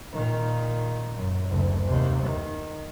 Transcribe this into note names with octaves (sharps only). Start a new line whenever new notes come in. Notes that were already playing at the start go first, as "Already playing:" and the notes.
A#2 D#3
F#2
F#1 D2
D#2 C3
D#3